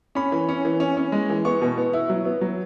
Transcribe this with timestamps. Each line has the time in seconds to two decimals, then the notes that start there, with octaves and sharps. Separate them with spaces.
0.15 C#4 B5
0.32 E3
0.49 C#4
0.65 E3
0.80 C#4
0.97 C#4
1.12 G#3
1.29 E3
1.45 B3 C#6
1.62 B2
1.78 B3
1.93 E4
2.09 F#3
2.25 B3
2.41 F#3